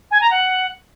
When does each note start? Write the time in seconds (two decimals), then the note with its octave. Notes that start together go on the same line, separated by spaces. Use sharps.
0.11 G#5
0.21 A#5
0.31 F#5